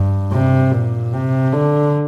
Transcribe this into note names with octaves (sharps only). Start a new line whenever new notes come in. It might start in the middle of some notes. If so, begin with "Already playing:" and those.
Already playing: G2
C3
A#2
C3
D3